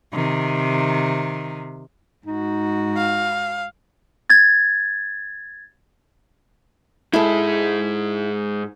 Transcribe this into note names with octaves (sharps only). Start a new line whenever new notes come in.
C3 D#3
G#2 D#4 F#4
F5
G#6 A6
G#2 G#3 E4 G#4 A4